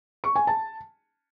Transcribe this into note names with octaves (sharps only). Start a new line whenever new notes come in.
C#6
G#5
A5